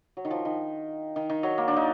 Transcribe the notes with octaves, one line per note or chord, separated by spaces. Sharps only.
F#3
D#3
F3
D#3
D#3
D#3
F#3
A#3
D4
D#4